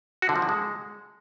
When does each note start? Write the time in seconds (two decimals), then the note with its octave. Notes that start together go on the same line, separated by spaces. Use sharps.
0.22 F#4
0.29 D3
0.36 F3
0.42 D3
0.49 G#3